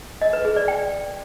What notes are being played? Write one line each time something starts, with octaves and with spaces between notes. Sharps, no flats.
D#5
B4
G#4
D5
G5